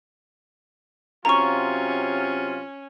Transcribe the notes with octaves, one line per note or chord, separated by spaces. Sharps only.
C3 F#3 C#4 F4 A#5 C#6